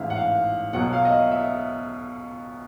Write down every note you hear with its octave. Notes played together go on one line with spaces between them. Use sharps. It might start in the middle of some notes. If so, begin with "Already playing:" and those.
Already playing: A1 G#2 E3 E5 F5
F#5
F5
B1 B2 F#3 F#5
F5
D#5
E5
E5